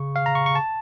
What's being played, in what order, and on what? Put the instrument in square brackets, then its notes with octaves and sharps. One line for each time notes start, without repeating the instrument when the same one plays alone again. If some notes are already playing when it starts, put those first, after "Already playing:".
Already playing: [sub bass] C#3 [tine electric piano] C#6
[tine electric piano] F5
A#5
C#6
C#6
A5